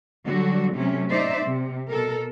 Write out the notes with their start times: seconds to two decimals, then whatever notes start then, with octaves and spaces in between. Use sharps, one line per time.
0.24 D3 F#3 G3 F#4
0.72 C3 F#3 A3 C#4
1.10 D#4 C5 D5 E5
1.46 C3
1.89 B2 A4 A#4